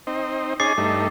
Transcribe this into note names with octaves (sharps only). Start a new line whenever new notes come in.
C4 D#4
C#4 D#4 G#4 D6 A6 C7
G2 A3 D#4